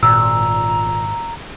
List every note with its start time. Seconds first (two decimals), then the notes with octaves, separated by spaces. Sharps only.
0.03 G#1 A#2 A#5 E6